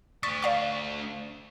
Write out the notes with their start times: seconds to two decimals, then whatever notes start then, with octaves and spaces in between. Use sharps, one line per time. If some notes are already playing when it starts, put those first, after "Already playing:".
0.23 A3 D4 C#6 A6 B6
0.42 D5 F5 C#6